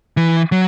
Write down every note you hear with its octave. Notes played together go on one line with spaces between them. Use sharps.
E3
F#3